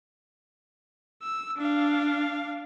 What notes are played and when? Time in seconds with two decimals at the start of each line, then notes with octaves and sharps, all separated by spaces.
1.22 E6
1.57 D4 F5